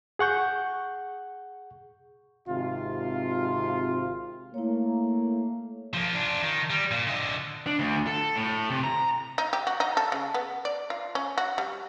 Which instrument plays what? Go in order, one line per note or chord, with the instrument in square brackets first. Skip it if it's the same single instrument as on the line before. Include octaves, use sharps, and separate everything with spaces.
[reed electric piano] G#4 F#5 C#6 G6
[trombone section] G#1 C3 F4
[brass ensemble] A3 A#3 [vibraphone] E4 C#5
[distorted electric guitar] F3 A#3
D4 F4
D#3
G3
A#2
D3 D#5
[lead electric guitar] D4
D2
A4
A2
C3
A#5
[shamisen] D#4
G4
F#4
D#4
A4
C#3
B3
D5
F4
C#4
F#4
G3